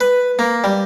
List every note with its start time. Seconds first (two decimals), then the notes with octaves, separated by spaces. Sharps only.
0.01 B4
0.39 A#3
0.64 G3